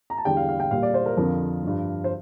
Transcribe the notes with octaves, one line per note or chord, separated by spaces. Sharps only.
A#5
A5
E2 D3 G3 G5
F5
F5
G5
A#2 G3 F5
D5
C5
A#4
F2 D3 F3 A#4
G2 F3
C5